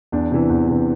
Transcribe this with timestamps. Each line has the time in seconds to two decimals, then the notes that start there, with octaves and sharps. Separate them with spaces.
0.12 E2 D4
0.31 C3 E3
0.49 E2
0.68 C3 E3